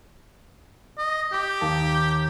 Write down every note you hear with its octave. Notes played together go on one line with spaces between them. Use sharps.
D#5
G4 D6 B6
D#2 A5